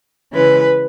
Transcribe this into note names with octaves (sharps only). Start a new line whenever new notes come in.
C#3 E3 G#3 B4